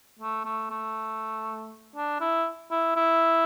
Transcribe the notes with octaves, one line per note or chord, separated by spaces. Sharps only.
A3
A3
A3
D4
E4
E4
E4